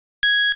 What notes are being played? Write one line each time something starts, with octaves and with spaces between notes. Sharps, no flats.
G#6